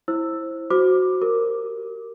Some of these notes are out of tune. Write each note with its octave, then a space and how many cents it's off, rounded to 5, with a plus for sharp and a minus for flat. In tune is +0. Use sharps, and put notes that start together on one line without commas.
E4 +0 C5 +20 E6 +0
F#4 +0 C5 +0 D6 +10
G4 -30 A#4 -15 D6 +0